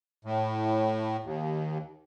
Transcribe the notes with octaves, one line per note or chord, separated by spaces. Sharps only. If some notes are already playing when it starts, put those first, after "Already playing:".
A2
D#2